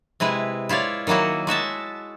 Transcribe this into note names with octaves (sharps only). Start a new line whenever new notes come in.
C3 G#3 E4 B4
E4 F4 C#5 D5
D#3 F#3 A#3 E4 F#4
G#3 F#4 E5 A5